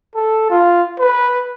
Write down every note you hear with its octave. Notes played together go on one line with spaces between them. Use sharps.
A4
F4
B4